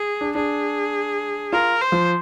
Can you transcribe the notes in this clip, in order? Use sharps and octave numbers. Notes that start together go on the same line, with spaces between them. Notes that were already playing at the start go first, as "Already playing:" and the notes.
Already playing: G#4
D4
D4 G#4
F4 A#4
C5
F3